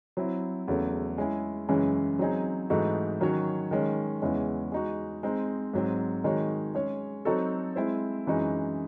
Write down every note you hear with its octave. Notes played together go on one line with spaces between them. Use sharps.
F#3 C4 E4
E2 C#3 F#3 A3
G#3 C#4 E4 G#4
F#2 C#3 E3 G#3 C#4
F#3 C4 D#4 G#4
G#2 E3 A3 D#4 F#4
D#3 F#3 C#4 F#4 C#5
D#3 G#3 C#4
E2 C#3 E3 G#3 C#4
G#3 D#4 F#4
G#3 C4 D#4
G#2 F#3 C4
D#3 G#3 D#4 F#4 C#5
G#3 C#4 G#4 C#5
F#3 C4 D#4 F#4 A4
G#3 C4 E4 C5
F#2 E3 G#3 D#4 F#4